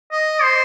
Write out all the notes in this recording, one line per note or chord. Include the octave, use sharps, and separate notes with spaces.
D#5
C5